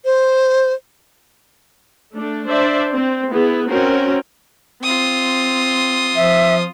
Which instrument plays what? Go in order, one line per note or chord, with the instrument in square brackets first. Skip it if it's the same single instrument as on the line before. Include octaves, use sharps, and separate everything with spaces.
[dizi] C5
[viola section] A3 D4
D4 C5 D5 E5
C4
B3 E4 G#4
C4 C#4 F#4 A#4
[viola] C4 [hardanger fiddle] F4 D#6
[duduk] F3 [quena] E5